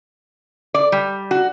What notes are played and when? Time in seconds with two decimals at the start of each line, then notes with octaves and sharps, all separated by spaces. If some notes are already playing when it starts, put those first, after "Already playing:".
0.74 D5
0.92 G3
1.31 F#4